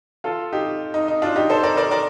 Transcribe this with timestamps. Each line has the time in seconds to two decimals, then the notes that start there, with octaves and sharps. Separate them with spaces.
0.24 F4 A4
0.52 D#4 G4
0.94 D#4
1.08 D#4
1.22 D4 F4
1.36 D#4 G4
1.50 A4 C5
1.63 A#4 D5
1.77 A#4 D5
1.91 A#4 D5